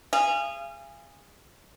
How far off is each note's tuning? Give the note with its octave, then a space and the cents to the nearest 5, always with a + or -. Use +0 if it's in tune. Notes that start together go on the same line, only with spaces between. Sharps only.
G#4 -20 F5 -35